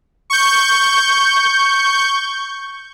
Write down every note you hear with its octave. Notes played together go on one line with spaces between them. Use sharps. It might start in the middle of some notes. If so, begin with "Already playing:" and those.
C#6 G6